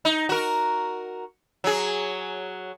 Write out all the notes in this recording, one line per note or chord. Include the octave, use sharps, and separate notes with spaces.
D#4
F#4 A#4
F#3 G#4